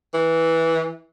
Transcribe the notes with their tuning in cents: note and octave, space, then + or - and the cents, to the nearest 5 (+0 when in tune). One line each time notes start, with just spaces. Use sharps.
E3 -10